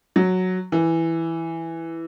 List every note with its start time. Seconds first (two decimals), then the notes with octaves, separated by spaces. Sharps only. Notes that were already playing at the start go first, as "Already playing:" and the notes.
0.16 F#3
0.72 E3